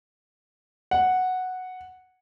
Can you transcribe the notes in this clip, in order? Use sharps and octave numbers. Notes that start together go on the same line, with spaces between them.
F#5